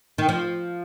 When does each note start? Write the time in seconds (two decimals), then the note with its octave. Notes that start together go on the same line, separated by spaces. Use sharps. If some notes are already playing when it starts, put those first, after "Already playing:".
0.18 D#3
0.29 F3